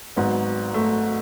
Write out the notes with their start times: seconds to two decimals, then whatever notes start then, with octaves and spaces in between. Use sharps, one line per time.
0.16 G#1 G#2 F#3 B3
0.74 A3